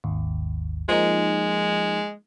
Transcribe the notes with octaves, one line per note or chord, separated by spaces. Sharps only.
G#1 D#2
F3 G#3 A#3 D#4